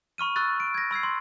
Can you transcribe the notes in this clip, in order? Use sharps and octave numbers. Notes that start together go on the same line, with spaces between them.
B5 C#6 F6 D#7
B5 C#6 E6 F#6 A6
D7
G#6 A#6
B5 E6 G#6 C7
C6